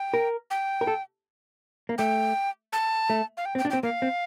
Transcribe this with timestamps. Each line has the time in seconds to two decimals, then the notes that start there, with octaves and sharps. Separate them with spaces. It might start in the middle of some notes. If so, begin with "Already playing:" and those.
Already playing: G5
0.14 A#4
0.51 G5
0.81 A#4
0.87 A4
1.89 A#3
1.98 A3 G5
2.73 A5
3.10 A3
3.37 F5
3.45 G5
3.55 C4
3.58 G5
3.65 D4
3.70 C4 G5
3.83 A#3 F5
4.02 C4